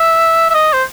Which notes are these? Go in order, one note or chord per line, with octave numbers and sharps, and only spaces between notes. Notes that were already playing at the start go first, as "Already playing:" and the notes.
Already playing: E5
E5
D#5
C5